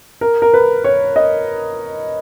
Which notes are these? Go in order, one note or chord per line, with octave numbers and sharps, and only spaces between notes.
A#4
A#4
B4
C#5
D#5